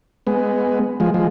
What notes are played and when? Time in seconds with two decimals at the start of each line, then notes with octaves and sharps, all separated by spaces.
0.27 G#3 B3
1.00 F3 G#3
1.14 F3 G#3